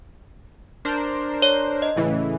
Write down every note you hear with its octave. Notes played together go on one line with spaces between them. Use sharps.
D4 A#4 C5
C#5
D#5
A2 C#3 E3